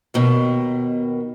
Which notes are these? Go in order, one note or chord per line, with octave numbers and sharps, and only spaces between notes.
D#2 B2 D#3